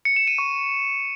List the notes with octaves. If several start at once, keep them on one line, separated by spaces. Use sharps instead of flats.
C#7
E7
D#7
C#6